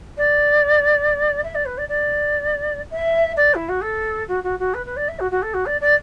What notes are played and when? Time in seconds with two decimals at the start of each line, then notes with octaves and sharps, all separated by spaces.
0.17 D5
1.44 E5
1.54 D5
1.65 B4
1.77 D5
1.88 D5
2.90 E5
3.36 D5
3.54 E4
3.68 F#4
3.82 A4
4.28 F#4
4.43 F#4
4.59 F#4
4.73 B4
4.85 B4
4.96 D5
5.08 E5
5.19 F#4
5.31 F#4
5.42 A4
5.53 F#4
5.65 D5
5.80 D5